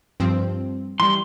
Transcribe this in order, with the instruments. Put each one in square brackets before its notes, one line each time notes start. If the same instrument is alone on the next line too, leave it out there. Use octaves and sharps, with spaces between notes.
[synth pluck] G2 F3 C4
[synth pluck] E3 G3 [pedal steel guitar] C6